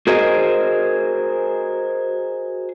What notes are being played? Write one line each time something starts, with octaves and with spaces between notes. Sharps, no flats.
F#4 G#4 A#4 C5 D#5